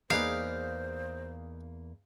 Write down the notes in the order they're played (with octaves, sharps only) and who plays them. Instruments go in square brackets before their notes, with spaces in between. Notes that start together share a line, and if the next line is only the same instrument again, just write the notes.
[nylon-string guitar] E2 A#3 D5 [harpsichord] D#4 G#4 B4 [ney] C5 [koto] F5